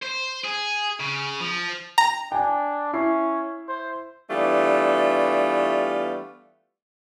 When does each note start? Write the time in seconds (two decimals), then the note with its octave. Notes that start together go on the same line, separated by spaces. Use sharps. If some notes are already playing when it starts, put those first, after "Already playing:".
0.03 C5
0.44 G#4
1.00 C#3
1.41 F3
1.98 G5 A#5
2.32 D4 G5 G#5
2.93 C#4 E4 C7
3.68 C5
4.29 E3 G3 A3 B3 D4 F4